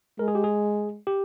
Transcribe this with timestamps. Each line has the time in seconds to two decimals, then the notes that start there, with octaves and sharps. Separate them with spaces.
0.19 G#3 A#4
0.28 G#4
0.35 G4
0.44 G#4
1.07 G4